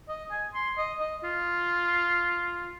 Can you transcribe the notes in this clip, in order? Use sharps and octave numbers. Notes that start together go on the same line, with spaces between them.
D#5
G#5
C6
D#5
D#5
F4